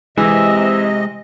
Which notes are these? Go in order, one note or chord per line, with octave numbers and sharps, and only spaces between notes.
C3 E3 G#3 D#5 E5